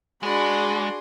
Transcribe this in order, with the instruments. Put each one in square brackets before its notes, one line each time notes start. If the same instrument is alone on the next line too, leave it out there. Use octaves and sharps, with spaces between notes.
[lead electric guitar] G#3 [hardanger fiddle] D4 B5 [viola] F#4 D5 [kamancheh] G#4 C6